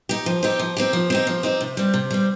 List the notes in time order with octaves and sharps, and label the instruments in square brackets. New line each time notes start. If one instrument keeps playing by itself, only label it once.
[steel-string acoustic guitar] D#4 G4
F3
C4 D#4 G4
F3
C4 D#4 G4
F3
C4 D#4 G4
F3
C4 D#4 G4
C3
G3 C4
C3
G3 C4